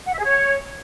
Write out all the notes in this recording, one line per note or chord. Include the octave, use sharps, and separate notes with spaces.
F#5
E5
G#4
C#5